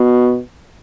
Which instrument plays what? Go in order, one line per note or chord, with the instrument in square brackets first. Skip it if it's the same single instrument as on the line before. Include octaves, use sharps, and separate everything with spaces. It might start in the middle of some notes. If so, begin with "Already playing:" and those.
Already playing: [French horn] B2